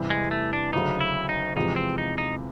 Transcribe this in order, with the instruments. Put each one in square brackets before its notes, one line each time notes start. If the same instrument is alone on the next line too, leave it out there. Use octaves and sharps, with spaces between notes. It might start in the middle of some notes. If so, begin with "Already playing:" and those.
Already playing: [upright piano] E2 C3 E3 G3 C4
[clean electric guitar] G#3
A3
D4
[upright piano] D2 C#3 F#3 [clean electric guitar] D#4
[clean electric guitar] E4
D#4
[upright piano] E2 C3 F3 G#3 [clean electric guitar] D#4
[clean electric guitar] C4
D#4
D#4